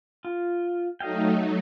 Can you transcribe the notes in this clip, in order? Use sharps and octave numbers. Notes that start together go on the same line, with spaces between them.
F4
F#3 A3 D#4 D#5 F5 G5